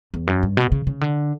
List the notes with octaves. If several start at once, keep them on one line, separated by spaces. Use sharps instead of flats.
E2
F#2
G2
B2
C#3
C#3
D3